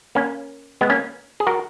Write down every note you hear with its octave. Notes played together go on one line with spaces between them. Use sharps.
A#3 C#4
G#3 B3
A#3 C#4
G#4
F#4 A#4